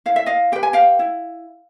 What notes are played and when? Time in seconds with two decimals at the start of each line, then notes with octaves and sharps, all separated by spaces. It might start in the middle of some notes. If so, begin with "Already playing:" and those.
0.06 E4 F5
0.16 E5
0.26 D#5 F5
0.52 G4 B4 G5
0.63 G#5
0.73 F5 G5
0.99 E4